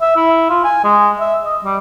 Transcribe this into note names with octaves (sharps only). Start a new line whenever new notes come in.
E5
E4
F4
G#5
G#3
E5
D#5
G3